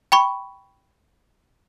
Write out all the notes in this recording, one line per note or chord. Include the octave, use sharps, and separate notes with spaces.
G5 B5 C#6